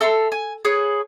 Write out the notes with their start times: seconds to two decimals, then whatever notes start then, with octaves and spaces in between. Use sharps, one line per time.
0.01 A4 E5 A#5 C6
0.32 G#5
0.65 G#4 B4 C#5